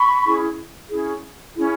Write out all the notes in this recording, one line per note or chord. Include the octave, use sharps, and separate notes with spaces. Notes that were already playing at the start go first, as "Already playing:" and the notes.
Already playing: B5 C#6
C#4 E4 G#4
C#4 E4 G#4
C#4 E4 G#4